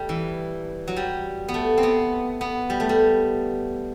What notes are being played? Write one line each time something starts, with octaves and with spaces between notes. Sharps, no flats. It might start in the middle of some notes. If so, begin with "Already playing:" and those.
Already playing: G3 A3
E3
F#3
G3
B3
A3
C4
B3
B3
G3
A3
G3